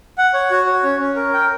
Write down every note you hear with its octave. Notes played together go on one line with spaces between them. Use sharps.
F#5
C#5
F#4
C#5
C#4
C#4
A#4
G5